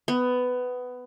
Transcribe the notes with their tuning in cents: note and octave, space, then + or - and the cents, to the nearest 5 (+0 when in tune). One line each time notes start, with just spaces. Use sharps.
B3 +15